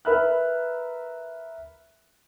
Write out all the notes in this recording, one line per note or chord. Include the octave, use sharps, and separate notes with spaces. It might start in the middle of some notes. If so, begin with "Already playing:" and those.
A#4 B4 E5 B5 F6 F#6